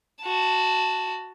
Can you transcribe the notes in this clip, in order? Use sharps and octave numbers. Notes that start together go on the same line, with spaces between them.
F#4 A5